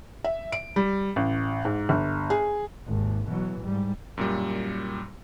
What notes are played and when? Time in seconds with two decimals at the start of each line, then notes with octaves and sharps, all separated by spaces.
0.24 E5
0.52 D7
0.76 G3
1.16 A1
1.65 G#2
1.89 G1
2.30 G#4
2.87 G#1 D#2
3.28 B2 E3 F#3
3.61 G#2 G3
4.17 F#2 A#2 G3